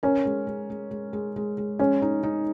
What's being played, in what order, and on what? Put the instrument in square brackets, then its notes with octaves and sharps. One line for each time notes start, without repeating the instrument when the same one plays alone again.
[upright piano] C#4 [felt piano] A#4
[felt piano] G#3
G#3
G#3
G#3
G#3
G#3
G#3
[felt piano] G#3 [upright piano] C#4
[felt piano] D#4
D#4